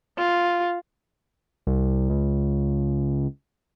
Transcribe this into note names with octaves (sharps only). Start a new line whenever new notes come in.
F4
C2
C#2